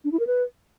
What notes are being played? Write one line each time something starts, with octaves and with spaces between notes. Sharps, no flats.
D4
E4
A#4
B4